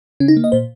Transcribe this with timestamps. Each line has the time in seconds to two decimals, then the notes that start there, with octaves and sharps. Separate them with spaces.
0.20 C#3 C#4
0.28 D#4
0.37 A#3
0.44 D#5
0.52 A#2 C5